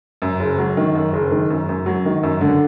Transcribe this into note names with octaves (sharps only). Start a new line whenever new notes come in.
F#2
F#1
F#3
D#3
F#2
F#1
D#3
F#2
F#2
F#3
D#3
F#2
D3